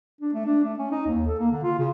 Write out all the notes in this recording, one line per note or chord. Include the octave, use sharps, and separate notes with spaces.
D4
A3
D4
A3
C#4
D#4
D#2
A4
A#3
D3
F4
C#3